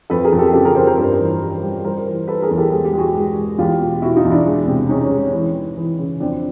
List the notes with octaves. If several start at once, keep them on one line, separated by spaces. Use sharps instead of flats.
F2 A4 B4
G#4 A#4
F2
G4 A4
C#3 G4 A4
G#4 A#4
F2 A#4 C5
A#4 C5
G2
E3
G3
G3
G3 A#4 C5
E3
G3 A4 B4
G#4 A#4
E2
G4 A4
G#3 G#4
G4
G#3
F#4 G#4
G#3
G#3
E2 F4 G4
B2
B2 E4 F#4
D#4 F4
E2
D4 E4
G#3
C3
G#3 C#4 D#4
C#4
G#3
E3
E3
E3
C#3
F2 C4 D4